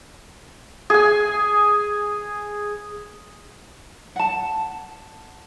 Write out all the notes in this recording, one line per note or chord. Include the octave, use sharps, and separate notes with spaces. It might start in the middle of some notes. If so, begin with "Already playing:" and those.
G#4 G#5
F#5 A5